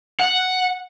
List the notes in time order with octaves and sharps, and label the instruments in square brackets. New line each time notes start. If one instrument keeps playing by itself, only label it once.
[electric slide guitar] F#5